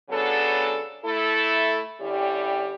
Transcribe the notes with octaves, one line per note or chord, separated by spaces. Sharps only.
C#3 F#3 B3 D4 A4
A3 E4 A4
D3 G3 C#4 E4 G4